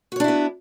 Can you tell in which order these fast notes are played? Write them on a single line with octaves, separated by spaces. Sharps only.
F#4 C#5 D4 E4 B3